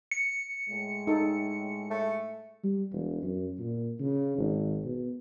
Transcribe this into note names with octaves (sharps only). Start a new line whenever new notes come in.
C#7
A2 G#3
D#4 A4
A3
G3
E1
F#2
A#2
C#3
G#1
B2